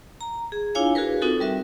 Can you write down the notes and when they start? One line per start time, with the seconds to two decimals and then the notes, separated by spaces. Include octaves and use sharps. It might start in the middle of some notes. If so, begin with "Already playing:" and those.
0.21 A#5
0.52 G#4
0.75 D4 E4 F4 C#5 F5 G#5
0.95 F#4 G#4 A#4 B4
1.22 C4 D#4 F4 F#4 A4
1.40 G3 A#4 E5